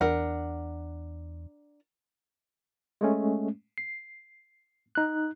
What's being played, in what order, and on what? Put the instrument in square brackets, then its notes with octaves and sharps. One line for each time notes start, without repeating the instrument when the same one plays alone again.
[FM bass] E2 [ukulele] D4 A#4 F#5
[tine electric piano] G#3 A3 C#4
C7
D#4 F#6